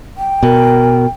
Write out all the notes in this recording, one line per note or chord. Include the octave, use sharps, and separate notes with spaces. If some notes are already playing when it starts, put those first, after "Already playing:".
G5
B2 A#4